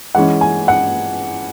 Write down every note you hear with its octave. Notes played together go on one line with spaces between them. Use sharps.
E3 G#3 C#4 F#5
G#5
F#5